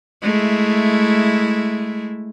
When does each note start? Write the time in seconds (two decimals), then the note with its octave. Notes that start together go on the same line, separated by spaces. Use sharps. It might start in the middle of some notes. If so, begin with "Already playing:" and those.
0.22 G#3 A3 E4